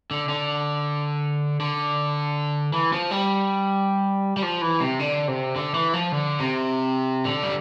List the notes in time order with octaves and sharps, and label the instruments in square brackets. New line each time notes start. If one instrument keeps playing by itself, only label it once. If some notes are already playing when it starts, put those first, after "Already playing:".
[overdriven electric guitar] D3
D3
D3
E3
F3
G3
G3
F3
E3
C3
D3
C3
D3
E3
F3
D3
C3
D3
G3